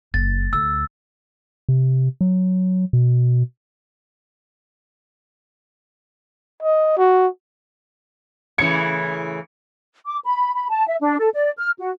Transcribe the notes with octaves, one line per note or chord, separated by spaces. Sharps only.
F#1 A6
D2 E6
C3
F#3
B2
D#5
F#4
A2 C#3 E3 G#6 C#7
D6
B5
B5
A5
E5
D4
A4
D5
F6
F#4